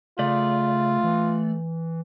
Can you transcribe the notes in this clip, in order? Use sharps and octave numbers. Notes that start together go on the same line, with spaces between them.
C#3 A3 F4 D5
E3